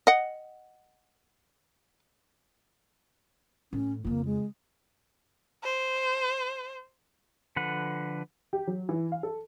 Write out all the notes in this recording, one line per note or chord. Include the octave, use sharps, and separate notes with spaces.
D#5 F#5
A2 C#4
F2 C#3 A#3
G#3
C5
D3 F3 B4 F#5
G4
F#3
E3
F5
A4